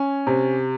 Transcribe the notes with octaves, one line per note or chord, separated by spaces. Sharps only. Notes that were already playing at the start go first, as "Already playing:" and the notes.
Already playing: C#4
C3